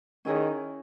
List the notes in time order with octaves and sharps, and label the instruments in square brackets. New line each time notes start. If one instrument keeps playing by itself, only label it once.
[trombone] D#3 [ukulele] C#4 E4 G#4 C#5